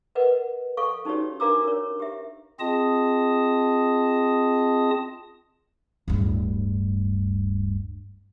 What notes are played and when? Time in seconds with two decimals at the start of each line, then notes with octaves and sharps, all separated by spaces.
0.15 A#4 B4 D#5 F#5
0.77 A4 F5 C#6
1.05 C#4 D#4 F#4 G4 C#5
1.40 D4 A#4 F5 A#5 D6 E6
1.64 A#4 C#5
2.00 G4 E5
2.60 C4 F4 G#4 D#5 A5 D#6
6.08 D1 G2